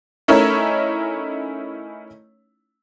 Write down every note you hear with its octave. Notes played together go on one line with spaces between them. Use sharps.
A3 C#4 D#4 E4 A#4 C#5